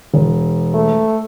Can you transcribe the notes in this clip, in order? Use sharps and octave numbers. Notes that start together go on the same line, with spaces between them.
E1
A3